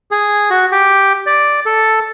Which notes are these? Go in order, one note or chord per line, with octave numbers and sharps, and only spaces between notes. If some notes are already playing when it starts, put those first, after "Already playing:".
G#4
F#4
G4
D5
A4